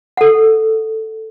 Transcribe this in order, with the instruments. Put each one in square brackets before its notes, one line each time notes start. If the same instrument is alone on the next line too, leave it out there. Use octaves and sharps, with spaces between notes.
[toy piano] A4 F#5